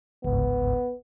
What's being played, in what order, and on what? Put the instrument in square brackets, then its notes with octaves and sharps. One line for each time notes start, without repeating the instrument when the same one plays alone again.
[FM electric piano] G1 C#2 G#2 [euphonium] B3